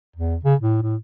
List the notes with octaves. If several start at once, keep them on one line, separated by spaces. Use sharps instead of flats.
E2
C#3
A2
A2